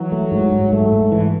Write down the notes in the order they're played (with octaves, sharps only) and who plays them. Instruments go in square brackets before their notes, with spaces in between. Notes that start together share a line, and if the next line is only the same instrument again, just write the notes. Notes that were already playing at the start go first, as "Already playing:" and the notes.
Already playing: [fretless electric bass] E3 [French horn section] F#3
[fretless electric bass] A3
G#2
G#2
[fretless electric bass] G#2 [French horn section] A3
[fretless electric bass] G#2
E3